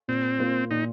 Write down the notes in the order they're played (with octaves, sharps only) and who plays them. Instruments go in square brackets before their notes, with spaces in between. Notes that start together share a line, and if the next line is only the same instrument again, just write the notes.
[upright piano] A#2 [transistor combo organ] C4
[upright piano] A#3 F4 C5
[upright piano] A#2 [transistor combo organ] D#4